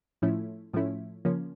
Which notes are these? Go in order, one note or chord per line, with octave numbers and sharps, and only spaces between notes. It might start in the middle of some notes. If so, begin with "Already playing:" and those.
A2 F3 A3 C#4 E4
A2 F3 A3 C#4 E4
C#3 F3 A#3 C#4